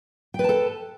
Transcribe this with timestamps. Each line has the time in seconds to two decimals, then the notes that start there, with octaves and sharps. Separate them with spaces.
0.34 G5
0.39 B4
0.44 A5
0.49 A4